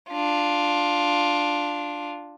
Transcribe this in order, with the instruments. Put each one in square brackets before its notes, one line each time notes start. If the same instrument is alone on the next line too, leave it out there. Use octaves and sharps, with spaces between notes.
[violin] D4 F4